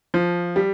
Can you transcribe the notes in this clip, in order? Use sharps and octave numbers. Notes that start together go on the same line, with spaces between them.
F3
G3